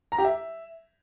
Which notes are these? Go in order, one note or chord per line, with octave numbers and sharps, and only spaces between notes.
A#5
G4
E5